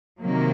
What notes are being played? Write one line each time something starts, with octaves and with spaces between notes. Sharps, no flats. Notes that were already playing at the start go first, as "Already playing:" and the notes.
C3 D#3 F#3 A#3